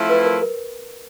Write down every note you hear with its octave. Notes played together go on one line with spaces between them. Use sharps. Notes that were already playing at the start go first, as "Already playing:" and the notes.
Already playing: F3 A3 C4 E4
B4
A#4
A#4